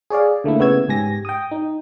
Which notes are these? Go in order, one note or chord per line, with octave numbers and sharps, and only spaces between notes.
G#4 C#5 D5 F5
D3 A3 A#3 E4
C#3 B3 C#5 E6 G#6
G#2 G4 G#5 A#6
G5 D#6
D#4